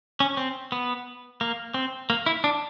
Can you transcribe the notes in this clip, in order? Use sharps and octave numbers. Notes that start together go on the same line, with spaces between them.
C#4
C4
B3
A#3
C4
A#3
E4
D4